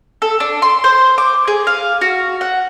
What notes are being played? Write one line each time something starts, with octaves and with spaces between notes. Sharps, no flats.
A4
D4
C6
C5
D6
G#4
F5
F#4
F#5